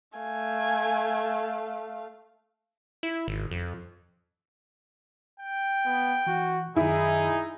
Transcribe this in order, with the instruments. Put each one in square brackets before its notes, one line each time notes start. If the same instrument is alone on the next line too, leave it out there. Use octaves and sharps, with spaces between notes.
[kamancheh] A3 F5 [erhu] G#5
[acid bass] E4
G#1
F2
[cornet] G5
[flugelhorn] B3
[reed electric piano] E3 [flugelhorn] F#4
[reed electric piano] F#2 D#3 [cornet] D#4 [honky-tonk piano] E4 [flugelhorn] G#4